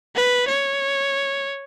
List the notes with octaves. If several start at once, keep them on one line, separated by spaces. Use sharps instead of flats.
B4
C#5